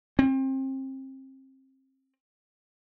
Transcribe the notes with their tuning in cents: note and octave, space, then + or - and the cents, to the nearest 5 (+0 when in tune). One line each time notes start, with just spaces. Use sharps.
C4 +30